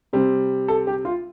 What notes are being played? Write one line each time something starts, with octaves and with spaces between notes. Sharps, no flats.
C3 G3 C4
A4
G4
F4